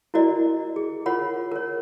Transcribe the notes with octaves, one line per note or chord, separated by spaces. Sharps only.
E4 F#4 A#4 D5 D#5
G#4
F4 A#4 C#5 F#5 B5
A#4 C#5